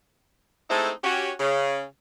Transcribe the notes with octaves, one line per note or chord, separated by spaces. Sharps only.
G#3 A3 C4 D#4 E4 A4
C#4 F#4 G4
C#3